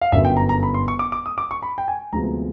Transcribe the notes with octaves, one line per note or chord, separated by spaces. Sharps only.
F5
G1 F#2 D3 E5
G5
A#5
A#5
B5
C6
C#6
D6
D6
D#6
D6
C#6
B5
G5
G#5
D2 C3 F3 G#3 B3 A#5